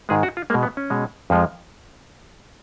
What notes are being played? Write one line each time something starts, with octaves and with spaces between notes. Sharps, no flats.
G#2 D#3 G#3 G#4
F#4
F4
B2 G#3 A#3
B3
C#4
B2 G#3
F2 F3 G#3